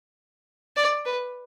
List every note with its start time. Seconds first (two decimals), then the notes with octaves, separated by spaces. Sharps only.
0.77 D5
1.06 B4